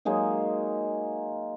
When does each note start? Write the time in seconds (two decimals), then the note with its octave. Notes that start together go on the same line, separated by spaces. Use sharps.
0.05 F#3 G#3 A#3 D#4